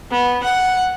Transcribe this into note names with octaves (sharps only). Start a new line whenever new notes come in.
B3
F#5